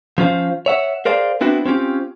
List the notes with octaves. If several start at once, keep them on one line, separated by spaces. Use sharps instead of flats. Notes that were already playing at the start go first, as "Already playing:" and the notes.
F3 C#4 F4 C5 F5
C#5 E5 F#5
G#4 A#4 C5 D5 F5
B3 C4 D4 E4 F#4
C4 C#4 F4 G4